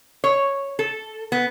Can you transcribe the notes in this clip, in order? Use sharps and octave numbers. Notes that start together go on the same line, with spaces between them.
C#5
A4
B3